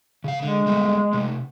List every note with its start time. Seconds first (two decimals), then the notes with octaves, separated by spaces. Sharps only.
0.24 C#3 F5
0.42 D3 G#3
0.66 G3 A3 B3
1.13 C3 A3